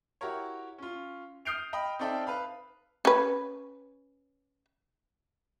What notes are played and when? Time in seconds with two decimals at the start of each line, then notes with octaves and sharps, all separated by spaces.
0.21 E4 F#4 G4 A#4 C#5
0.78 C#4 F4
1.45 D#6 F6 G6 C7 D7 F7
1.73 D#5 G5 B5
1.99 C4 D#4 A4 D5 E5 G5
2.27 B4 F5 B5
3.05 C#4 B4